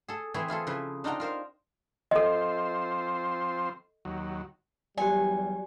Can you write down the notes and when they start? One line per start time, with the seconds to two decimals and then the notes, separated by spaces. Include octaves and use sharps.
0.08 G#4 A4
0.34 E3 C4 E4 G#4 C#5
0.48 E4 F4 G#4 A4
0.67 C#3 F3 E4 B4
1.04 D4 D#4 F4 F#4 G5 A#5
1.20 F4 A#4 C5 F5
2.11 F3 C4 A4 C5 D#5
4.05 D#2 F#3
4.98 E2 F#3 G3 G4 D5 G#5